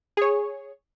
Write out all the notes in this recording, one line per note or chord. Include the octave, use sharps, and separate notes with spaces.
G#4 C#5